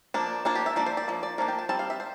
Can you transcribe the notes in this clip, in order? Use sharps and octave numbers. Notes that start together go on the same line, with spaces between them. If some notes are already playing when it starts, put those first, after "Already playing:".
F3 A#3 D4
F3 A#3 D4 F4
G4
E5
F3 A#3 D4 D5
C5
D5
F3 A#3
D5
F3 A#3 D4 A#4
G5
A5
G3 C4 A5
F5
E5
C5